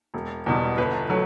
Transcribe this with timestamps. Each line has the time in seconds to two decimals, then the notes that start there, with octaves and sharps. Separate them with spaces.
0.14 E1
0.46 E2 B2 G3
0.77 G1 B4
1.10 F#3 A3